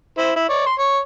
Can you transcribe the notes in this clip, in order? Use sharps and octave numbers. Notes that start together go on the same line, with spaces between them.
E4 C5
E4
C#5 D5
C6
C#5